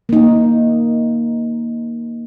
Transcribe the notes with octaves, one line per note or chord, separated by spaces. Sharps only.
A#3 D#4